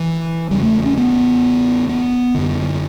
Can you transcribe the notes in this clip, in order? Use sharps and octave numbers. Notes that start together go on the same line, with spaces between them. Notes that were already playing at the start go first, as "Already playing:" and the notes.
Already playing: E3
E2 C#3 G3
A3
C#4
B3
B3
F#2 D3